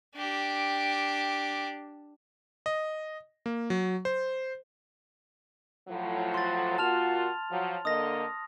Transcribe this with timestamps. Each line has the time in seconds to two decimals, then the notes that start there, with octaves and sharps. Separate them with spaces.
0.16 D4 G4
2.66 D#5
3.46 A#3
3.70 F#3
4.05 C5
5.88 A2 F3 F#3
6.34 C6 A6
6.78 A#2 F4 F#4 A5 F6 F7
7.50 F3 F#3
7.85 D3 A#3 D#5 D#6 A#6